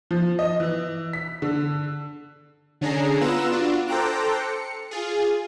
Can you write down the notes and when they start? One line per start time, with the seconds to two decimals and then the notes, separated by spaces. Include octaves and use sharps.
0.11 F3
0.39 D#5
0.60 E3
1.13 B6
1.42 D3
2.81 D3 C#4 D4 G#4 A#5 C7
3.21 B3 F4 A#5 E6 F#6 E7
3.52 D4 F4 F#4
3.87 A4 C5 G5 A#5 D6 F#6
4.41 C#7
4.91 F4 G#4